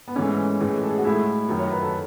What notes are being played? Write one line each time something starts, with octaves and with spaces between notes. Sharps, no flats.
B3
G#2 E3 A3 C#4
A2 E3 G#3
A4
G#4
F#4
A2 G#3 E4
F#2 D#3 F#3
C#5
B4
A4